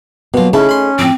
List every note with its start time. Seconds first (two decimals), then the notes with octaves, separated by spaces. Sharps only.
0.34 B2 F#3 A#3 F4
0.53 C#3 A3 C#4 D#4 E4 G#4 A5
0.69 B5 C6
0.99 A2 F3 C4 D6